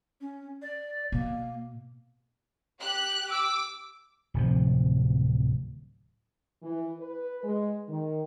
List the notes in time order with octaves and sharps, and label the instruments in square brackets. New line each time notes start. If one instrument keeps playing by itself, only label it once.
[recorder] C#4
D5
[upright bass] B2 [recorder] A#3
[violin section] G4 F#6
[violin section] D6 [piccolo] E6
[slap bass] D1 C3 F3
[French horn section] E3
B4
G#3
D#3